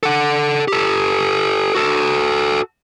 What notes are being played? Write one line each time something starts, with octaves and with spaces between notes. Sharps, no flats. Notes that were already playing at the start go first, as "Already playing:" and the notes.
A4 F#5
G4 A4
F#4 A4